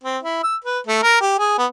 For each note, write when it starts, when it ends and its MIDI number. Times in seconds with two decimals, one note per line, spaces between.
0.04 0.18 60
0.23 0.39 64
0.43 0.56 88
0.64 0.79 71
0.87 1.00 57
1.03 1.21 70
1.21 1.37 67
1.39 1.56 68
1.58 1.66 59